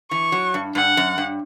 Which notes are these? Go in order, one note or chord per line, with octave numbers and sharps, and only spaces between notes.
E3 C#6
F#3
G2
G2 F#5
F#2
G2